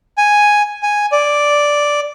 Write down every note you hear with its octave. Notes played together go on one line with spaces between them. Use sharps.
G#5
G#5
D5